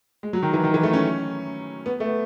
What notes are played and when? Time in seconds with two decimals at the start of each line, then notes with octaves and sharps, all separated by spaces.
0.23 G#3
0.33 F#3
0.42 D#3
0.53 E3
0.64 D#3
0.74 E3
0.83 A3
0.93 C#4
1.86 B3
2.00 A3
2.06 B3